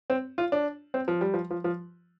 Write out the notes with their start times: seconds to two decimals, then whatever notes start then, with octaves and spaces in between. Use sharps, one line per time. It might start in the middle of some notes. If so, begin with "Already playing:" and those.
0.10 C4
0.38 F4
0.52 D4
0.94 C4
1.08 F3
1.21 G3
1.34 F3
1.50 F3
1.64 F3